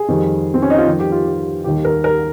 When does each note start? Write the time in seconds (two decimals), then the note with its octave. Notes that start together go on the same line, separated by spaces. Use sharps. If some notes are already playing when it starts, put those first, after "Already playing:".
Already playing: G#4
0.08 F2 D#3 G3
0.54 C4
0.62 C#4
0.70 D#4
0.78 F4
0.86 F2 D#3 G3 G4
0.99 G4
1.12 F4
1.26 G4
1.64 D#2 D#3 G3 G4
1.85 A#4
2.04 A#4